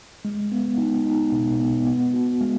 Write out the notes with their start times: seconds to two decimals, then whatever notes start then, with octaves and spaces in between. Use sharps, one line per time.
0.25 G#3
0.52 B3
0.78 D#4
1.06 D#4
1.32 B2
1.59 B3
1.86 B3
2.13 F#4
2.41 G#3